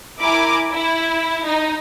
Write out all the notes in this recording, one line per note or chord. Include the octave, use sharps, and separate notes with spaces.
E4 A#4 G#5 D6
E4
D#4